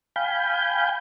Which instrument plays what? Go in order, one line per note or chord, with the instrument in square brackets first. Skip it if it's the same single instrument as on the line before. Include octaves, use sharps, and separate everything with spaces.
[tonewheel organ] F5 G5 G#5 B5 G6